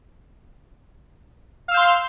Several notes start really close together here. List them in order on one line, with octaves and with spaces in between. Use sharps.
F5 E6 G6 C6